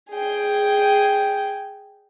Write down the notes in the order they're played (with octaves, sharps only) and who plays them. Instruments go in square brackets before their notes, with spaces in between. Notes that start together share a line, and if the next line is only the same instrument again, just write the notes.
[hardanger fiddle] G#4 G5